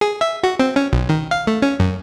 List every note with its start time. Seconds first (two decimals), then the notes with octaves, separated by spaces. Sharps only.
0.01 G#4
0.21 E5
0.43 F#4
0.60 C4
0.76 C#4
0.93 B1
1.09 D#3
1.31 F5
1.47 A3
1.62 C#4
1.80 F#2